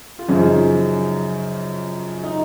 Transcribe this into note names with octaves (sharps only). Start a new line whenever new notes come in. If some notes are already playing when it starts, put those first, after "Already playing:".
F4
F#2 C#3 F3 D#4
D#4